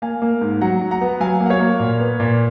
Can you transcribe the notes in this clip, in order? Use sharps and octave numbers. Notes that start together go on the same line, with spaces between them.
A#3 F5 G#5
A#3
G#2
F#3 F#5 A#5
F#3
F#5 A#5
B3
F#3 F5 G#5
A#3
F#5
C#5 F5
A#3
A#2
B3
A#2